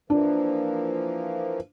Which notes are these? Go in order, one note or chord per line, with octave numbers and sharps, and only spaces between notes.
E3 F3 A#3 D4